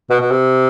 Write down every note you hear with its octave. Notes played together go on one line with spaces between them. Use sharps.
B2
B2
C3